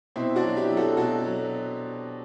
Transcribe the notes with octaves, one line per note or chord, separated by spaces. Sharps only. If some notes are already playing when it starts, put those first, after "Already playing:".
B2 C4 E4
D4 F#4
F#3
E4 G4
F#3
F#4 A4
B2 F#4 A4
F#3